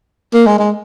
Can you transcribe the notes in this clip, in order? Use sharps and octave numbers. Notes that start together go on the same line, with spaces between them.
A#3
G#3
G#3